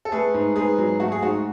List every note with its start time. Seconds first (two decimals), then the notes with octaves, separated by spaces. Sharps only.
0.05 A4
0.12 A3 G#4 B4
0.34 G#2
0.56 G#2 G#4 B4
0.78 F#3
1.00 A3 F#4
1.12 G#4
1.22 G#2 F#4